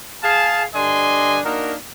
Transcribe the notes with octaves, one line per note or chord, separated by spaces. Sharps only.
G#4 F5 A5
G2 D3 D4 D#5 G#5 C6
A#3 D4 D#4 F#4 A#4